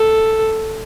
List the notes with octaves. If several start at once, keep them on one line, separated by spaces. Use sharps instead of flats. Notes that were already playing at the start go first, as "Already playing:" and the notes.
Already playing: A4